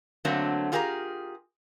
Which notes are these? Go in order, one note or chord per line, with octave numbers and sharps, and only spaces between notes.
D3 F#3 A3 A#3 C4
F4 G4 G#4 A#4 E5 A#5